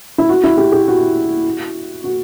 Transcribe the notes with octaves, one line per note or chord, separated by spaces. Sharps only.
E4
F#4
E4
G4
G4
F#4
F#4